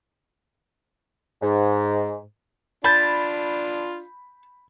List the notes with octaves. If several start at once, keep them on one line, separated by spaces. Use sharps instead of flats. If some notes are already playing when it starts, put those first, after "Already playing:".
G#2
D4 F4 A5 B5 G6